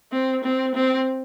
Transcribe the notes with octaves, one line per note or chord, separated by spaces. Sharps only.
C4
C4
C4